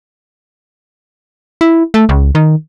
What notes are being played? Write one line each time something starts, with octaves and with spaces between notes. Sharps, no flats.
E4
A3
C#2
D#3